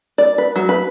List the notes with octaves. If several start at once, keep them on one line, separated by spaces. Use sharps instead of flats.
D5
B4
F#3
B4